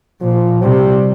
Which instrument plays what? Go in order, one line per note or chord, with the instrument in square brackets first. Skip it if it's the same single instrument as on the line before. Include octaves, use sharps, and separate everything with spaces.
[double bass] A#2 [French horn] F3
[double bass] C3 [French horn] G3